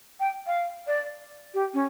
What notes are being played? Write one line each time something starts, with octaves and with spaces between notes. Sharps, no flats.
G5
F5
D5
G4
C#4